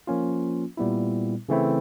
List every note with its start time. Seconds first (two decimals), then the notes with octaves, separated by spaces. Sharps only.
0.07 F3 A#3 C#4 F4
0.77 A#2 G3 B3 E4
1.49 C#3 E3 A3 C4 E4